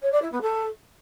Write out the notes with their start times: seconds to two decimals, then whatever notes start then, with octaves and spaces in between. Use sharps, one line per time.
0.02 C#5
0.12 D5
0.22 E4
0.32 B3
0.42 A4